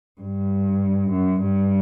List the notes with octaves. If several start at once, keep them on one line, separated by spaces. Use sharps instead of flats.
G2
F#2
G2